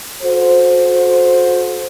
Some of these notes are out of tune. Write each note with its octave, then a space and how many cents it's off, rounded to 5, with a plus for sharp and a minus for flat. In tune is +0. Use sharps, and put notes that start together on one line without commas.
F#4 -35 A4 -25 C5 +0